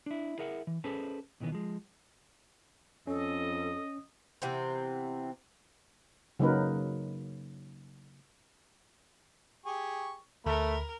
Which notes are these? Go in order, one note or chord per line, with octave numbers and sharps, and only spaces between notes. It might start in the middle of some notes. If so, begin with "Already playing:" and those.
D4 E4
E4 G#4 A#4 E5 F#5
E3
C#4 G#4 A4 B4 C5 A5
C#2 B2 D#3 E3 B3
F3 G#3
F2 C#4 A4 D#5
C3 E3 B3 C4
C#3 F#3 A#3 D#4 A#4 B4
G4 G#4 C#6
D2 A3 A#4 B5